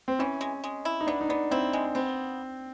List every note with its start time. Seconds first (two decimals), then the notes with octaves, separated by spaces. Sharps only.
0.08 C4
0.19 E3 C#4
0.41 G#3
0.64 G#3
0.85 E4
1.01 D#4
1.07 B3 D4
1.21 D#4
1.29 B3 D4
1.51 C4 E4
1.73 G#3
1.95 B3 C4